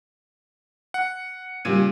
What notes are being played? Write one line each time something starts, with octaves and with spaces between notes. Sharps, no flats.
F#5
A#2 C#3 G3 G#6 D#7